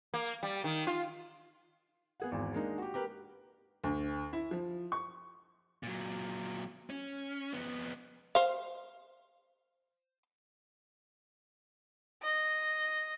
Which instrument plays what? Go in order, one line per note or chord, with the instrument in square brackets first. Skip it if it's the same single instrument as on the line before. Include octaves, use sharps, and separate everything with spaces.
[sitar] A#3
G3
D#3
F4
[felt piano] B3 G#4 F#5
G#1 E2
G#3 A#3 D4 D#4
F#4 G4
G4 A#4 B4
[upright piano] D2
E4
F3
C#6
[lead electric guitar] A#2 F#3
C#4
F2 B3
[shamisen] C5 F5
[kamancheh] D#5